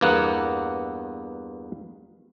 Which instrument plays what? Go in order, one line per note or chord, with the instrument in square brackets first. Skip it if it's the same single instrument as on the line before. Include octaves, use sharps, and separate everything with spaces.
[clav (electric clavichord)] E2 G2 A#3 B3 F#5